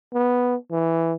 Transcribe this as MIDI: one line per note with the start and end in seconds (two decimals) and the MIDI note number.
0.14 0.56 59
0.71 1.14 52